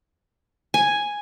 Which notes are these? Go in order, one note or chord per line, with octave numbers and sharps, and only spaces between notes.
G#5